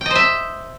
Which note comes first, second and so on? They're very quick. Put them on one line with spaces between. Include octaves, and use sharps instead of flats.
G5 D#5 C5 E5